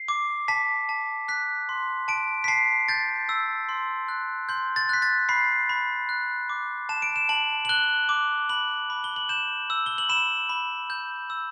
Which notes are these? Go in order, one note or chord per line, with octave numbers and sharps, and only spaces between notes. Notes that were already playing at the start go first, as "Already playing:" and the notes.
Already playing: C7
D6
A5 B6
A5
F#6 B6
C6
A5 D7
B6
A5 C7
G6 A6
E6
C6
F#6
C6 G6
A6
F#6 B6
A6
B5 C7
B5
F#6
D6
A5 E7
D7
E7
A5 F#7
F#7
F#6 G7
D6
B5 F#7
B5
G7
F#7
G6 E7
E6
G7
F#7
B5 E7
B5
G6
E6